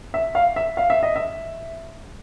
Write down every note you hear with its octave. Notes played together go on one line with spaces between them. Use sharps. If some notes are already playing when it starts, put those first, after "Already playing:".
E5
F5
E5
F5
E5
D#5
E5